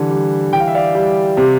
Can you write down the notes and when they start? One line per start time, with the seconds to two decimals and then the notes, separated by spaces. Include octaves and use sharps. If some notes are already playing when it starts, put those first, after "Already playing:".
Already playing: D3 E3 G3
0.10 G3
0.52 E3 G5
0.60 F5
0.68 E5
0.75 D5 F5
0.95 G3
1.37 C3